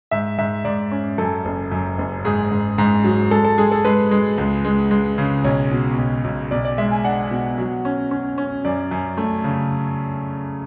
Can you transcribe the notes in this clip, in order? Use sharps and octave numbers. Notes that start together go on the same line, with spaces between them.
G#2 E5
G#2 E5
G#2 D5
C#4
F#2 A4
F#1
F#2
F#1
G#2 G#4
G#2
G#2
F#3
G#3 A4
A4
G#3 G#4
A4
G#3 B4
G#3
C#2
G#3
G#3
C#3
B1 C#5
B2
B1
B1
B1 D5
D5
G#3 E5
G#5
D4 F#5
B2
F#3
C#4
C#4
C#4
F#2 D5
F#2
A3
C#3